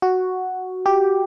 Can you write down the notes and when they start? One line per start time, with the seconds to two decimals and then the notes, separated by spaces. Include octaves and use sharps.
0.02 F#4
0.86 G4